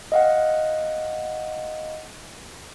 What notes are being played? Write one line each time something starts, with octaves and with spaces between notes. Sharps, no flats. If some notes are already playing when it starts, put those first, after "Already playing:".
D#5 F5 F#5